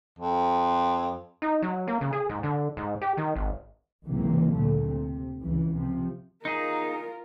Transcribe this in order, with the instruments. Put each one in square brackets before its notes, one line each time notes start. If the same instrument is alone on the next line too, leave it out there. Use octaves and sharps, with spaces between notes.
[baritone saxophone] F2
[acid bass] D#4
F#3
A#3
C#3
G#4
G#2
D3
G#2
G4
D#3
G#1
[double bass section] G#1 C#2 C3 E3 F#3 A#3
D2 A#2 D3 A3
C3
C#2 E3
C3 F3
[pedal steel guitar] D#4 G#4 [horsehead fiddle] F4 A#4